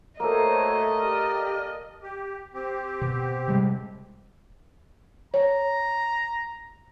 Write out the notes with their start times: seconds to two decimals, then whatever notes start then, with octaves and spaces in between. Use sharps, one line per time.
0.20 A3 A#3 F#4 A4 C5 C#5 D#5
0.99 G4 D5 F6
2.02 G4
2.54 C4 G4
3.02 B2
3.48 C3 G3 G#3
5.34 C#5 A#5